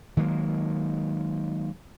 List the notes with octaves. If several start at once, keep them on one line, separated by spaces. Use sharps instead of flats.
D#3 F#3 G#3 A#3